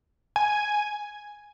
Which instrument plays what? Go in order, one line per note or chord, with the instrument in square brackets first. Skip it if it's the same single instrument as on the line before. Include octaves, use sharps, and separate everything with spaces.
[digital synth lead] G#5